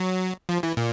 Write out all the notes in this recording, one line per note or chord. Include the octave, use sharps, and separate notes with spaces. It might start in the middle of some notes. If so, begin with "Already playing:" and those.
Already playing: F#3
F3
E3
A#2